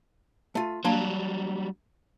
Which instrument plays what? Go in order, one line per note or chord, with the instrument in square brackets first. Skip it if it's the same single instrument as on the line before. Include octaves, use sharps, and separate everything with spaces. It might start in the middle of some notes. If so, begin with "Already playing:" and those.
[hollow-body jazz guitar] A3 F4
[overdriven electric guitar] F#3 G3 [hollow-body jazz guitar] A#3 D4 C6